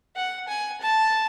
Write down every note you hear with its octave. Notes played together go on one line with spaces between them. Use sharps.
F#5
G#5
A5